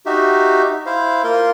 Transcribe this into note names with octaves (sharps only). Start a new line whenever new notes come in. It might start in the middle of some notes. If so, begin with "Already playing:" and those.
D#4 F#4 G4 E5
E4 C5 F5
A#3 F4 A#4 C6